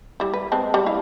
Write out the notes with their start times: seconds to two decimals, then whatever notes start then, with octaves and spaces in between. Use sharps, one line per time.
0.20 G3 E4
0.33 B4
0.52 G#3 C4 A5
0.74 G3
0.86 E4 F5